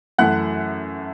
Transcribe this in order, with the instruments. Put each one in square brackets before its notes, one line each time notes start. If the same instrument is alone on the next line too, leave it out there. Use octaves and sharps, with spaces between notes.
[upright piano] F#2 E3 A3 F#5 F#6